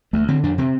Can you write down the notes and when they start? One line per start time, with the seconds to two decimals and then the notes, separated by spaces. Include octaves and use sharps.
0.13 D2 A3
0.28 D3 C4
0.43 F2 D4
0.58 C3 C4